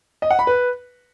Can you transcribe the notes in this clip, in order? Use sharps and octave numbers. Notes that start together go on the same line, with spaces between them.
D#5
F#5
B5
B4